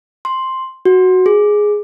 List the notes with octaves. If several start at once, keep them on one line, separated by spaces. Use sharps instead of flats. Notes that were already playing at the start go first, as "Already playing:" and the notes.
C6
F#4
G#4